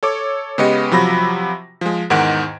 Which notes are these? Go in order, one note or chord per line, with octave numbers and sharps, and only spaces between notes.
A4 C#5 D6
C#3 G#3 B3 G4 D#5 C#7
C3 F3 F#3 B5 A#6
F3 G#3
E2 G#2 D#3 F#5 G#6 D7